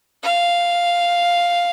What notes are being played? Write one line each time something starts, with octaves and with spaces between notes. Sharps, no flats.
F5